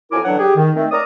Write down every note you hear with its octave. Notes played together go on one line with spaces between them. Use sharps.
F2 F#3 E4 A#4 G#5 D6
D3 E3 F#3 D4 C#5 F#5
G4 G#4
D#3
D#3 A3 C4
A#4 C#5 D5 A#5 D#6